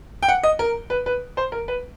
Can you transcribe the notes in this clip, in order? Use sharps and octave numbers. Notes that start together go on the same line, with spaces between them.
G5
F#5
D#5
A#4
B4
B4
C5
A#4
B4